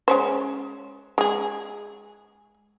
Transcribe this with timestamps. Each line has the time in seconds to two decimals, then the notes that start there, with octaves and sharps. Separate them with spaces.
0.08 G#3 C#4 C5
1.18 G#3 G#4